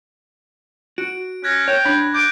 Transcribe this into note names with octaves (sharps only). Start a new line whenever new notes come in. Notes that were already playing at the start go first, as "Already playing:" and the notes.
F#4 D7
C#4 F#6 G#6 A#6
C#5 G5
D4 B5
D6 F#6 G6